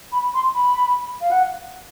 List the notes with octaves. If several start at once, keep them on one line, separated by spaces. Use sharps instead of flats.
B5
C6
B5
F5
F#5